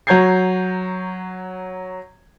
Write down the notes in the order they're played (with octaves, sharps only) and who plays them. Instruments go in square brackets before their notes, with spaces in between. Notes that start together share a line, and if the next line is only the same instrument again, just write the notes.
[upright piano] F#3 C#5 A#5 G6 G#6 C7